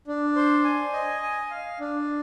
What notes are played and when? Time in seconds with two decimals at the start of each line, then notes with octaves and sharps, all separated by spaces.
0.07 D4
0.36 C5
0.64 G#5
0.93 D#5
1.23 G#5
1.51 F5
1.80 D4